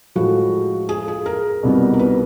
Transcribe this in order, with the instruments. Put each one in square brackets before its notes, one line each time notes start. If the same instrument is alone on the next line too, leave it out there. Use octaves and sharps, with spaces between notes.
[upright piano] A2 F3 G#3 [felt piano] F#4
[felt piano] G#4
G#4
A#4
[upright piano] C2 B2 G3 B3 D#4
[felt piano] A#4
B4